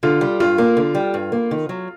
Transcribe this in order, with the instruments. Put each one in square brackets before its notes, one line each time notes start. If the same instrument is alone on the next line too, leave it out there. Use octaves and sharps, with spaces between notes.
[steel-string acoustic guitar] D3 [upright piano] F4
[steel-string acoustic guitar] G3
[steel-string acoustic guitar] G2 [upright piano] F4
[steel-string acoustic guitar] A#3
D3
G3
G2
A#3
D#3
F#3